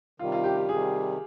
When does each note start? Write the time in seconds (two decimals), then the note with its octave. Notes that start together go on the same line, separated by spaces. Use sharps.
0.19 C3 D#3 G3 F4
0.32 F4
0.44 G4
0.57 G4
0.69 C3 D#3 G3 G#4